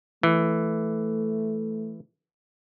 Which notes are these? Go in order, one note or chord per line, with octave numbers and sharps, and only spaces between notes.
E3 A3